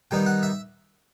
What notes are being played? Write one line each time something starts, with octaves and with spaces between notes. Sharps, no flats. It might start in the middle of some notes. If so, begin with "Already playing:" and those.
D#3 G3 B3 D#4 G5
F#5
E5